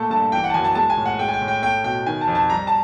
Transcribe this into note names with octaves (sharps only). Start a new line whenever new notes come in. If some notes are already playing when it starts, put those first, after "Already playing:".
Already playing: A#2 A3 A5
G2 A5
E3 G5
F#5
A5
F#2 G#5
A5
G#3 A5
G#5
A2
F#5
G#3 G5
G#5
G5
A2
G5
A3 G5
B2 G5
D#3 G#5
A5
F2
A5
G3 A#5
A5